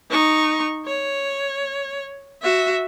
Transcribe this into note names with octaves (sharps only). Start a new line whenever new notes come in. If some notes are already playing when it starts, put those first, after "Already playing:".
D#4 C#6
C#5
F#4 E5